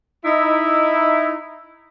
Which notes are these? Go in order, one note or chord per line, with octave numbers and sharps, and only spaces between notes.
D#4 E4